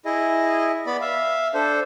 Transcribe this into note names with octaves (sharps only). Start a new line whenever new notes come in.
E4 G#4 D#5
B3 D5 B5
E5 F5
D4 A4 C5